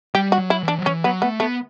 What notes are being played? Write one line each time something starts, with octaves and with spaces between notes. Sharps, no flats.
G3 G4
F#4
F#3
E4
E3
D4
F#3
E3 C#4
F#3 B3
A3 B3
A3 B3